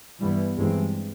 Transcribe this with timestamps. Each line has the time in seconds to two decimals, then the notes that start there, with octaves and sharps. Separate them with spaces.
0.19 G2 E3 G3 B3
0.57 G2 E3 G#3 C4